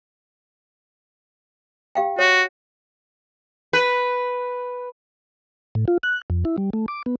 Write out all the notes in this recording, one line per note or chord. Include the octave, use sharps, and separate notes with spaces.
G4 F5 G5
F#4 C#5
B4
A2
F4
F#6
F2
E4
G3
A3
D6
B3